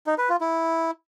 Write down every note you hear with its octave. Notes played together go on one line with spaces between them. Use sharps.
D#4
B4
F4
E4